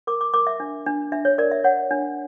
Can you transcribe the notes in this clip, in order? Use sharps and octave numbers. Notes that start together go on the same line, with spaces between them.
A#4 D6
D6
A#4 D6
E5
D4
D4
D4 E5
C#5
A#4 D5
E5
C#5 F#5
D4